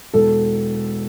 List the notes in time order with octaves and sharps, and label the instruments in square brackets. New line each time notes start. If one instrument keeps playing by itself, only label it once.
[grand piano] E1 A4